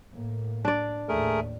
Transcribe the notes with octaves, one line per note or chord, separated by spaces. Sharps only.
A2 A#3
D4 D5
D#2 A2 A3 G#4 A#4